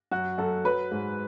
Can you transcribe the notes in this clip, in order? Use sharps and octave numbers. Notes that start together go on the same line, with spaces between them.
F#2 F#4
F#2 A4
F#3 B4
G#2